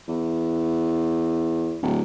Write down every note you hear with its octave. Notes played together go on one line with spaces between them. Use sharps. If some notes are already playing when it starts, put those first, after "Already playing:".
E2
D1